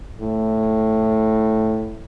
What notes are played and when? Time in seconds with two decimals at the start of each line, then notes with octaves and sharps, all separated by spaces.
0.20 A2